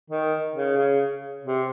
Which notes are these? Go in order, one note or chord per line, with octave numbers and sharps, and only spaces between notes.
D#3
C#3
C#3
C3